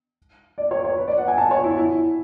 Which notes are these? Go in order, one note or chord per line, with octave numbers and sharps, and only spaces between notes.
D5
C#5
C#5
B4
D5
F#5
G#5
A5
C#5
E4
E4